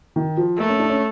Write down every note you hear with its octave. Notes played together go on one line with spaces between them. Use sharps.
D#3
F3
A3 A#3
C#4
D4
C#4